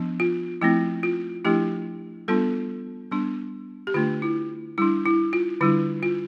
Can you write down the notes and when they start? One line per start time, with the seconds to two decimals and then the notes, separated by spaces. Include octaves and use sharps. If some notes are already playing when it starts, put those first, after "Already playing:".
Already playing: F3 B3 D4
0.20 F4
0.61 F3 A3 C4 E4
1.03 F4
1.45 F3 A3 D4 E4 G4
2.28 G3 B3 D4 F4 A4
3.11 G3 B3 D4
3.87 G4
3.94 D3 A3 D4 F4
4.22 E4
4.78 G3 D4 E4
5.06 E4
5.33 F4
5.61 D3 G3 D4 E4
6.03 F4